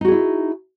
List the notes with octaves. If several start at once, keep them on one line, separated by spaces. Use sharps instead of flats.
D#4 E4 F#4 G#4